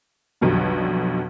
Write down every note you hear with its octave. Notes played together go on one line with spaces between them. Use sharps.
B1 F2 B2 D3 G3